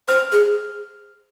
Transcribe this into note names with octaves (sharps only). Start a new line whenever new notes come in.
C5 F6
G#4